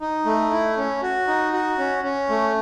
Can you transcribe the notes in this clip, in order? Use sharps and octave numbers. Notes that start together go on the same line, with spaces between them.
D#4
A3
E4
C#4
F#4
D#4
F#4
C#4
C#4
A3